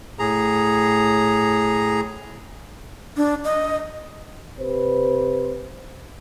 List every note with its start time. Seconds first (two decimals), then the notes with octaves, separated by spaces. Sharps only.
0.19 A2 G#4 A#5
3.17 D4
3.45 D#5
4.59 C3 B4 C5